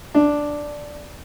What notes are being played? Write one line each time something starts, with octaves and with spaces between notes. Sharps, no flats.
D4